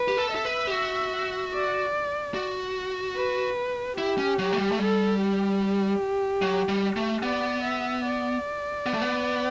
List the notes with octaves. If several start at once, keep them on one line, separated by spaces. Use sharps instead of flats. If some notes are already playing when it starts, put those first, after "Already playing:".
Already playing: B4
G4
A4
A4 E5
B4
G4
F#4
D5
F#4
B4
E4 G4
C#4
F#3
A3
G3
A3
G3 A4
G4
F#3
G3
A3
B3 D5
E5
D5
B3
A3
B3